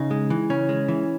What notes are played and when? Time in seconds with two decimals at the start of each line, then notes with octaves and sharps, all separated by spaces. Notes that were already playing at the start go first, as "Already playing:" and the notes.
Already playing: C#3 D#4
0.11 G#3
0.30 E3
0.50 C#3 C#4
0.69 G#3
0.88 E3